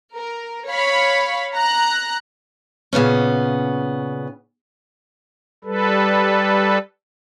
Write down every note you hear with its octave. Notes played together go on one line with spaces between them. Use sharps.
A#4
C#5 F5 B5
A#5 F#6
A#2 C#3 B3 C#4
G3 A4 B4